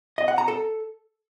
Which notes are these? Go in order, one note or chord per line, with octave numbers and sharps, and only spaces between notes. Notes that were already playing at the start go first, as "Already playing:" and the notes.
D#5
F#5
A#5
A4